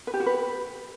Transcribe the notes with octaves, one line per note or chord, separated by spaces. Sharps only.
B4
G4
F#4
B4